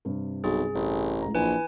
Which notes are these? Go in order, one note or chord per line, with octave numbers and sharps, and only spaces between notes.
G2 C3
B1 G#4
A1
C#2 A2 A#5
A#1 E3 B4 G#5